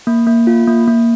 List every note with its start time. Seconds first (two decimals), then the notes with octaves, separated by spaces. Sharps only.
0.07 A#3
0.27 A#3
0.47 F4
0.67 A#3
0.88 A#3